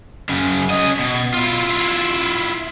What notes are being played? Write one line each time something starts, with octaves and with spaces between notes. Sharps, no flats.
F#2 C#3
C#4 D#5
B2
E4 F4